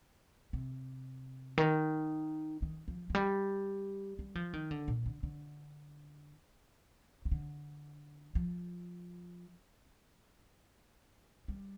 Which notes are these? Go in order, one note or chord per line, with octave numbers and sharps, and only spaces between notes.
C3
D#3
D#3
F3
F3
G3
G3
F3
D#3
D3
A#2
D3
D3
D#3
D3
F3
G3